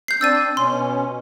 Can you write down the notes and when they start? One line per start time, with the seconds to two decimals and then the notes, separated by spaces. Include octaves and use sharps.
0.08 G6 C7
0.21 C4 D4 E6 A6 D#7
0.57 B2 C#4 C6